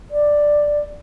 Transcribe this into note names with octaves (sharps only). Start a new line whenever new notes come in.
D5